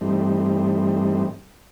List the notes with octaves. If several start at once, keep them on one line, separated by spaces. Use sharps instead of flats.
G2 E3 G3 A3 C4 D#4